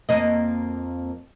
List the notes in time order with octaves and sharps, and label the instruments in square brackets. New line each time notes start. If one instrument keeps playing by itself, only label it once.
[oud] F2 A#3 D#5